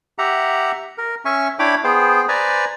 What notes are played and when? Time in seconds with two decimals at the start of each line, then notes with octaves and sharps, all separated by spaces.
0.19 G4 E5 F#5 A#5
0.98 A#4
1.25 C#4 E5 G#5 C#6
1.59 D4 E4 C#5 G5 B5 D6
1.84 B3 G#4 C5 G5
2.28 B4 C5 D5 G#5 A#5